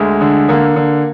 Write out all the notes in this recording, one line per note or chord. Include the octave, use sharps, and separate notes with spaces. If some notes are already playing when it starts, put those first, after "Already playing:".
Already playing: D2 G#3
D3
D3 A#3
D3